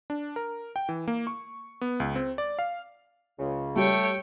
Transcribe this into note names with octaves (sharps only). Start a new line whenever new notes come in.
D4
A#4
G5
E3
A#3
C#6
B3
C#2
C4
D5
F5
C#2 C#3
G3 A3 G4 C#5 G5